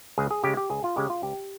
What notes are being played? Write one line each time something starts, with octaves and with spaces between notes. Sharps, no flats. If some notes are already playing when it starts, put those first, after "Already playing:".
C#2 G#4
G#4
C#3 G#3 G4
G4
C#2 G#4
F4
C#3 G#3 G4
F4
C#2 G4